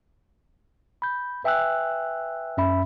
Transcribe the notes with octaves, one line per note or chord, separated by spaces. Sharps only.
B5 G6
B4 E5 G5 G#5 E6 F#6
F#2 C#4 E5 B5